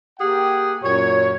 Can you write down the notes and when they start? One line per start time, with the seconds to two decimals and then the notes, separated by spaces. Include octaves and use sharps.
0.20 A#3 G4 G#4 F#5 G5
0.84 F#2 A#2 C#5